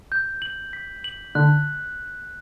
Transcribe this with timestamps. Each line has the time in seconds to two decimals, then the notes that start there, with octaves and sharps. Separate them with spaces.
0.12 G6
0.42 F#7
0.73 B6
1.04 F#7
1.35 D3 F#6